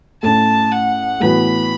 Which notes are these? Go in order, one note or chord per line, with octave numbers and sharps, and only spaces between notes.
A2 A3 C#4 A5
F#5
A2 E3 B3 F#4 B5